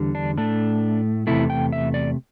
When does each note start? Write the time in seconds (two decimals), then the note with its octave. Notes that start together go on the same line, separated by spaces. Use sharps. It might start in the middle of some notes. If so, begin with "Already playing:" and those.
Already playing: E2 D3 G3
0.15 D4
0.37 A2 A3 D4
1.27 E2 C3 A3 E4
1.50 G5
1.72 E5
1.94 D5